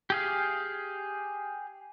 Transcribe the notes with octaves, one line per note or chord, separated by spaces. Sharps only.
G4 G#4 F5